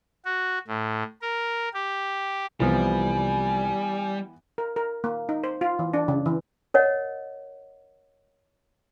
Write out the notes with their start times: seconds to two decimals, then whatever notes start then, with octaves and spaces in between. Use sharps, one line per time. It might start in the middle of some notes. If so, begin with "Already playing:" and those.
0.25 F#4
0.67 A2
1.22 A#4
1.74 G4
2.60 C2 E3 F3 G3 B3 G#5
4.58 A#4
4.76 A#4
5.04 A#3
5.29 D#4
5.44 C5
5.61 F4
5.79 E3
5.94 D4
6.08 C#3
6.26 E3
6.74 A#4 C#5 D#5 F#5